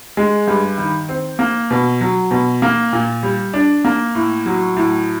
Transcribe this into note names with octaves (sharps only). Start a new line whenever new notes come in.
G#3
G2
D#3
C4
A#3
B2
F#3
B2
A#3
A#2
G3
D4
A#3
A2
F#3
A2